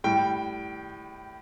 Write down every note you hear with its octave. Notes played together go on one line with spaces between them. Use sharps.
A2 G3 G5